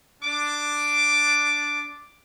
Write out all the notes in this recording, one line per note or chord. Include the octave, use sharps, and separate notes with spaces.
D4 D6